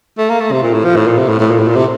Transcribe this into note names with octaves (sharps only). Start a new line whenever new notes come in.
A3
A#3
A3
C3
A#2
A2
F3
A2
A#2
C3
A2
A2
A#2
A2
A#2
C3